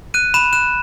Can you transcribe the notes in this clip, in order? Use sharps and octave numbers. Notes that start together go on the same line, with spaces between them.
F#6 D#7
B5 E7
F#6 E7